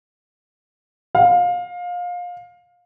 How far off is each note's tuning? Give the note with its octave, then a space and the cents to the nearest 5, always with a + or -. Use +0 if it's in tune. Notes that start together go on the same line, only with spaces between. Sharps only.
F5 +25